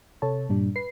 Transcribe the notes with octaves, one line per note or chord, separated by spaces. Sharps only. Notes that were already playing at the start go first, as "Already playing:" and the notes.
C3 A4 C#5 A5
G2 A#2 G3 D4
B4 C7